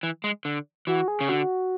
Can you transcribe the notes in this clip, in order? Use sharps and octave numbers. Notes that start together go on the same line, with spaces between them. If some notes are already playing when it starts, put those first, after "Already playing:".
E3
G#3
D3
E3 F#4
G#4
C#3
D3 F#4